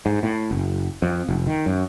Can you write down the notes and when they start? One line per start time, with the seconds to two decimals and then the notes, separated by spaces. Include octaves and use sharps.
0.06 G#2
0.23 A2
0.51 F#1
1.02 F2
1.28 F1
1.47 D#3
1.66 F#2